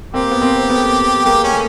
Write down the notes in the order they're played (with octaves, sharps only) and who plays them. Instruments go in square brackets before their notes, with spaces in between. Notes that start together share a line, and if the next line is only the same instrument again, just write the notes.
[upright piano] A#3 C4 [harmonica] G4
[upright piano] B3
A#3 C4
A3 B3
[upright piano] G#3 A#3 [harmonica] G4
[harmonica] C#4
[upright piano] A3